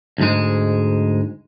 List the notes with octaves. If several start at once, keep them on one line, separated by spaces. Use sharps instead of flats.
D2 G#2 G#3